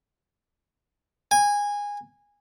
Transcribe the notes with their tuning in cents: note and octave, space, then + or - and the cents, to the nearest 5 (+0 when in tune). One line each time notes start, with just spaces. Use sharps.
G#5 -15